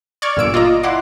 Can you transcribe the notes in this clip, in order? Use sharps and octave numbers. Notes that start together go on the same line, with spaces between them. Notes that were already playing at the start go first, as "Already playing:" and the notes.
D5 C#6 F6 G#6
G1 A#2 E6 D7
F4 D5 D#5 A#5
E4 F#5 C6 D6